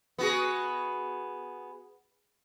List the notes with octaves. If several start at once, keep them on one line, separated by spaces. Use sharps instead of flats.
B3 F#4 G#4